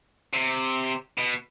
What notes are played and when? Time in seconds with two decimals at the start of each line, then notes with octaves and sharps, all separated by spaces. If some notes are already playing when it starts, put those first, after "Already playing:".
0.33 C3
1.18 B2